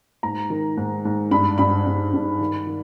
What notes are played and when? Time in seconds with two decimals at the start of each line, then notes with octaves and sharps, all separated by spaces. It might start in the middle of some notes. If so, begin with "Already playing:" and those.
0.23 G#2 A#5
0.50 D#3
0.77 G#2
1.05 G#2
1.31 G2 B5
1.58 G2 B5
1.86 G2
2.13 G2
2.40 D#3
2.67 D#3